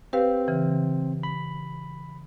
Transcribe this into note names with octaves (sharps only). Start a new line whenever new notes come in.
C4 G4 B4 F5
C#3 E3
B5